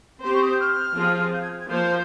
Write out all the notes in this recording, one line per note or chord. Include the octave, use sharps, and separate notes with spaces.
C4 G4 C5 C6
C#6
D#6
G6
F6
F3 C4 F4 G#4
G6
G#6
G#6
F3 A#3 F4 C5 G6